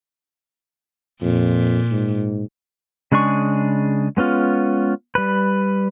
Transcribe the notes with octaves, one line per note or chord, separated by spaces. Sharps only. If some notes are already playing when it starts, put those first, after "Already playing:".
F2 A#2
G#2
C#3 G#3 D4 G#4 C#6
G#3 B3 C#4 F4
G3 B4